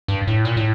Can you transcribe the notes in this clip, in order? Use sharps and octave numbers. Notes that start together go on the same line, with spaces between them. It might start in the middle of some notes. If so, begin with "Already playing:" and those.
G2
A2
A#2
A2